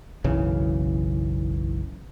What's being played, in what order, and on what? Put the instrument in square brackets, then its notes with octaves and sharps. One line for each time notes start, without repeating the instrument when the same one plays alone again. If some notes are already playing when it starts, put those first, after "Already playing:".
[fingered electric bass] F#1 B1 C#3 E3